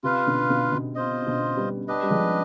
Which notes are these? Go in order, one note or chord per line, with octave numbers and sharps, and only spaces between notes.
C3 F4 B4 F5
B2 D3
B2 D3
B2
F4 C5 D#5
B2 D3
G3 B3
D4 G4 B4 D#5
G3
F3 G#3